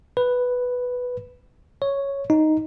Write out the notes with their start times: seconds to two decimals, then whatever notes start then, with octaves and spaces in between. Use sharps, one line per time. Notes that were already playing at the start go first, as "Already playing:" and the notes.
0.17 B4
1.82 C#5
2.30 D#4